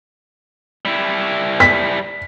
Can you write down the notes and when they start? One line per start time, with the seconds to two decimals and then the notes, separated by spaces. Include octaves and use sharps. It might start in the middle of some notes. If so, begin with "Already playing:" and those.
0.85 G3 E4
1.60 B6